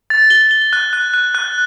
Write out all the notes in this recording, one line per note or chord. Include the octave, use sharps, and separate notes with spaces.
A6
G7
G7
F#6
F#6
F#6
F#6